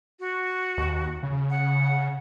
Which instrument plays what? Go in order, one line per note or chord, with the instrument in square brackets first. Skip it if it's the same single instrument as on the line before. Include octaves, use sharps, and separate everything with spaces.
[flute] F#4
[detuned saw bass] D#2
C#3
[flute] F#5